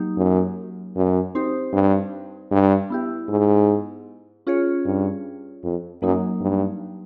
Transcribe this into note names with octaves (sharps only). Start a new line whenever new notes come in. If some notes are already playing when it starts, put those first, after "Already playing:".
Already playing: F#3 A#3 D#4 G4
F#2
F#2
C4 D#4 G4 C5
G2
G2
B3 E4 G4
G#2
C#4 F4 G#4 C#5
G2
F2
F#2 F#3 A#3 D#4
G2